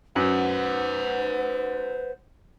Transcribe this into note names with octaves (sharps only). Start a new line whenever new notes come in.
F#2 B4 C5 F#5